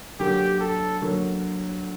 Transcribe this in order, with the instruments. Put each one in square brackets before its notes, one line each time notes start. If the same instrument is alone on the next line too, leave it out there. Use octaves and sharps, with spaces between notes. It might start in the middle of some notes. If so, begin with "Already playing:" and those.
[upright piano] D3 F#3 A#3 [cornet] G4
[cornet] A4
[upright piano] D3 F#3 A#3